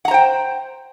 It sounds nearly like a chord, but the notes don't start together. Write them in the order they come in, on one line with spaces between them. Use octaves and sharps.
F#5 A#5 C5 G5